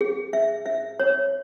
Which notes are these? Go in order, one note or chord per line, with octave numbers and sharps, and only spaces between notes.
G#4
E5
E5
C#5